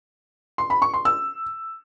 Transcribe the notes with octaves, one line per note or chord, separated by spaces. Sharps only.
C6
B5
C#6
C6
E6